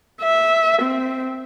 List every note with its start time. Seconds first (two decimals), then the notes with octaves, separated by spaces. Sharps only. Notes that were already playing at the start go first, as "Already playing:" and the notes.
0.22 E5
0.81 C4